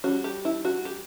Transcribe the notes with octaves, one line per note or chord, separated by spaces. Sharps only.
G3 C#4 F#4
G4
E4
F#4
G4